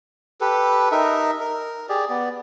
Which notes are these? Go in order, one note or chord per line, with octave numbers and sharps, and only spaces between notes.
G4 A4 B4
D#4 A#4 E5
A#4
G4 G#4 D5
B3 D5